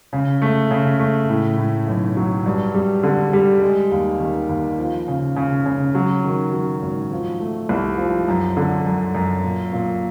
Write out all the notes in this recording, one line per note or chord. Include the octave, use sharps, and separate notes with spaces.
C#3
A3
C#3
A3
A2
A2
B1
F#3
G2
G3
D3
G3
G#3
D#2
D#3
D#2
F3
C#3
C#3
C#3
F#3
D#3
F#3
G#1
F3
A3
C2
F3
F#2
D3
F#2
F#2
A#2
A#2